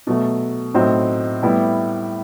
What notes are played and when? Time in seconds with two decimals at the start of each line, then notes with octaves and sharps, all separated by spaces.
0.07 B2 F#3 A3
0.74 A2 F#3 C4 D#4
1.42 A2 G3 B3 E4 G4